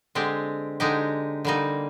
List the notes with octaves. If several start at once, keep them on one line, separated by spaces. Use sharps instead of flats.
D3 G#3 C4 G4
D3 G#3 D#4 G4
D3 G3 A#3 D#4